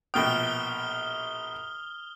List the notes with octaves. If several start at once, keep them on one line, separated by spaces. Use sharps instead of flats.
A#1 B2 G5 D#6 F6 G7